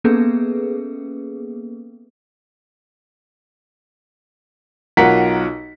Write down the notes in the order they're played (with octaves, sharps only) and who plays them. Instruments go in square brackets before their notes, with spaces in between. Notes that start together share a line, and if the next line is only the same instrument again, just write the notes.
[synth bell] A#3 B3 C#4 G#4 A4 B4
[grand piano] B1 F4 F#4 A#4 F#5 B6